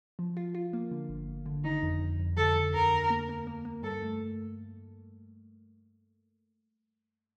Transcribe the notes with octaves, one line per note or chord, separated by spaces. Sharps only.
F3
F4
F4
A#3
D3
G1
G1
D3
D#3 D#4
F2
F2
F2
D3 A4
D3
D#2 A#4
D#2
A#3
A#3
A#3
A#3
G2 A4
A3